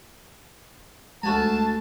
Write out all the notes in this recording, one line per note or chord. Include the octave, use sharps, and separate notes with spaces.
D2 G#3 A3 F#4 G#5 A5